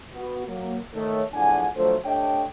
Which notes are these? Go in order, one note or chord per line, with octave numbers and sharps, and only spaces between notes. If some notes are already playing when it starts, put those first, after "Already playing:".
B3 F#4
F#3 A#3
D#3 A3 C#5
E2 A2 F3 D4 F#5 G#5
D3 F3 F#3 A3 C5
A3 D4 G4 C#5 D#5 G5